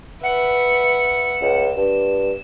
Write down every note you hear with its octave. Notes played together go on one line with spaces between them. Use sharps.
B4 E5 F#5
C#2 E7
G2